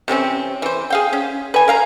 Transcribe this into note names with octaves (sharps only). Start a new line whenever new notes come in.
C3 E3 C4 C#4
E3 C5
G#4 F5 G5
C#4
B4 G#5
A#4 F5 A#5